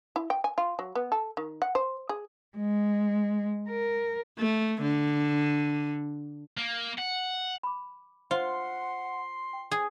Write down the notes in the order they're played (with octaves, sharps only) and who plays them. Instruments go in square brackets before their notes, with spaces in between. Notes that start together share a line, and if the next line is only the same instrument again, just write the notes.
[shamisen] E4
G5
G#5
F4
F#3
B3
A4
D#3
F#5
C5
G#4
[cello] G#3
A#4
[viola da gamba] A3
D3
[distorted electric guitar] A#3
F#5
[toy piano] B5 D6
[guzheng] F4 [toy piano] C5 [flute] F#5 [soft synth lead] C6
[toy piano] G5
[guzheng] G#4 [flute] G#5